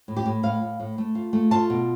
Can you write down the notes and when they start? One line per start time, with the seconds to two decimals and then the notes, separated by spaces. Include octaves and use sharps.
0.08 A2
0.17 G4
0.26 A2
0.43 A2 F5
0.61 A2
0.80 A2
0.98 A3
1.15 F4
1.33 A3
1.51 F4 A5
1.70 B2